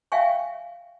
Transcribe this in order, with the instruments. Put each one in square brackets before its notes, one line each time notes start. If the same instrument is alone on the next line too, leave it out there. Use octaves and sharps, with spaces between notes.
[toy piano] E5 F5 G5 G#5 C#6